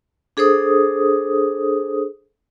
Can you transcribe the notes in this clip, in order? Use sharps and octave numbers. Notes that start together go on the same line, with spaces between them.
D4 G#4 A4 C5 D#6